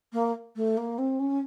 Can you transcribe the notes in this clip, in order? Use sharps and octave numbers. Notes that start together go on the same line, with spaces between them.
A#3
A3
A#3
C4
C#4